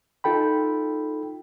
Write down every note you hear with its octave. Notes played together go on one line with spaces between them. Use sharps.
D#4 F4 A4 G5 B5